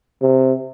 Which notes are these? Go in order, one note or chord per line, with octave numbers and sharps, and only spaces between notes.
C3